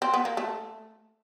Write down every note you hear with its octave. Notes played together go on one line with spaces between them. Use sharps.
C4
B3
A#3
A3